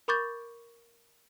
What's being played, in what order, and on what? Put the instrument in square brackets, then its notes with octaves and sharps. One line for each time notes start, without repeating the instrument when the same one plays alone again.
[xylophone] A#4 B5 C#6 D6 G6 A6